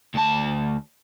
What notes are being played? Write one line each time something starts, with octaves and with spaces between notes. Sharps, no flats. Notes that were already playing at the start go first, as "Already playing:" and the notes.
D2 A5